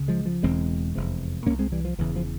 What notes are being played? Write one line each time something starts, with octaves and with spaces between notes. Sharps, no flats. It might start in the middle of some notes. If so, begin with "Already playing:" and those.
Already playing: C#2 C#3
F3 G#3
F3
E1 E2 C#3 G#3 C4
F1 E2 C3
C2 A#2 A#3 C#4
G#3 C4
E3 G3
F3
E1 E2 C#3 E3
F3